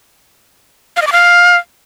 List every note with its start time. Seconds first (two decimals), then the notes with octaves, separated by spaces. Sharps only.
0.96 F5
1.02 D#5
1.07 D6
1.12 F5